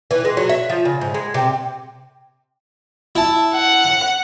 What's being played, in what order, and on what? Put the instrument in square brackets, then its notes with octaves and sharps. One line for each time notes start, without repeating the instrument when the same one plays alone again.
[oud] E3
G#3
F#3
E5
F3
C#3
G#2
G#3
C3
[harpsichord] E4 A5
[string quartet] F#5